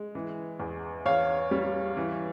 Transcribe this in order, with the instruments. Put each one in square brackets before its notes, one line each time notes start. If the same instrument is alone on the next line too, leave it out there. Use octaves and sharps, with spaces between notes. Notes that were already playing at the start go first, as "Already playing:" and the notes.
Already playing: [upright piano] G#3
E3
E2
E2 C#5 F5
G3
E3